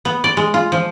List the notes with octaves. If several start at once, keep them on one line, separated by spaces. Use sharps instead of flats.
B3
D5
G#3
F4
F3